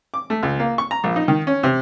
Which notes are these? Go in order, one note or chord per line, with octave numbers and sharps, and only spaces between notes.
D6
A3
C#2
A#3
C#6
A#5
A#1
D#4
D#3
C#4
C3